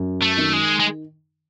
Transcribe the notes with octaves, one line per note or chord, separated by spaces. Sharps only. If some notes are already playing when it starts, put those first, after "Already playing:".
Already playing: F#2
A3
D#3
G#3
G#3